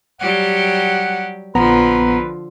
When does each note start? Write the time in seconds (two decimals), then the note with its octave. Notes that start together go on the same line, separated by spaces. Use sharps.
0.20 F#3 G3 G4 F#5
1.55 A#1 D3 F3 B3 B4 A#5